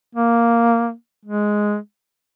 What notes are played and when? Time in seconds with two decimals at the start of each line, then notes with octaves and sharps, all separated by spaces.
0.15 A#3
1.25 G#3